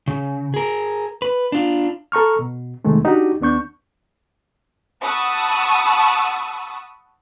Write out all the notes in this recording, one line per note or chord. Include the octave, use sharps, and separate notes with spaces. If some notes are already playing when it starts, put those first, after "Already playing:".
C#3
G#4 A#4
B4
D4 F4
A4 A#5 C#6 F6
B2
F2 C3 D#3 G#3 A3
D4 D#4 F#4 G4
D#2 B3 D4 C#6 G6
F#5 A5 B5 C#6 D#6 E6